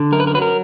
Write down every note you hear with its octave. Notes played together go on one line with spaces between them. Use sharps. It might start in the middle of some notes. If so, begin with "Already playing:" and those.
Already playing: D3
F#2 A#4
B4
A#4
F#3 B4
A#4